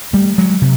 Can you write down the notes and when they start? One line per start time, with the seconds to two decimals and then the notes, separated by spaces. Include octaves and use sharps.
0.13 G3 A3
0.38 F#3 G#3
0.62 C3